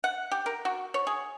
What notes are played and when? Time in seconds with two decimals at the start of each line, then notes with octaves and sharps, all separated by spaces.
0.04 F#5
0.32 G4
0.46 A#4
0.65 F#4
0.94 C#5
1.07 G#4